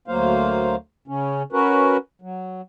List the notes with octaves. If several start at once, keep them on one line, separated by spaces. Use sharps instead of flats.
D2 F#3 A#3 C5 F5
C#3 C#4
C#4 F#4 A#4 B4
F#3